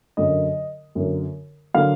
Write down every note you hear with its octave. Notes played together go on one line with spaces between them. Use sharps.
F#2 D3 F#3 A#3 D#5
F#2 D3 F#3 A#3
D3 F#3 A#3 F5